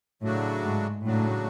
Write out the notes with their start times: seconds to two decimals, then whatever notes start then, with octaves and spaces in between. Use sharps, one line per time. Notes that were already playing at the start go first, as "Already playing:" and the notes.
0.22 A2 C#3 F#3 A3 D4 F#4
0.64 G#2
1.04 A2 C#3 F#3 A3 D4 F#4